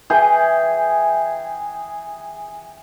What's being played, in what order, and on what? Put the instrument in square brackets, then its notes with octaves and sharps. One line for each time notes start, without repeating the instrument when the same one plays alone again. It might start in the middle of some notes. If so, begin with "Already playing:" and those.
[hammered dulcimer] E3 G#4 G5